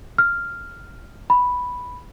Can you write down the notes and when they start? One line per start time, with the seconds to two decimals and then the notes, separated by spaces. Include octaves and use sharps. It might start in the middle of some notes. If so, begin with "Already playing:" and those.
0.18 F6
1.30 B5